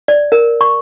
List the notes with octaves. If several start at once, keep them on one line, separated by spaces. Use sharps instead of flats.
D5
A#4
C#6